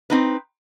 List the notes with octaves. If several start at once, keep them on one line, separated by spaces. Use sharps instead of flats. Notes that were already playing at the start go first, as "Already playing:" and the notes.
C4 D#4 B4